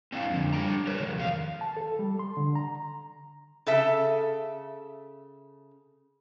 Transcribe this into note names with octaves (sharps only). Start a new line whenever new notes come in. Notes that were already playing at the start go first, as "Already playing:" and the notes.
C4 D4 E4 F5
F2 D3
G3 D4 E4 G5 A#5
A#4 B4 C#5
C3 D#3
F2 F#4 F5
A5
A4
G3
C6
D3
A#5
C#3 A4 E5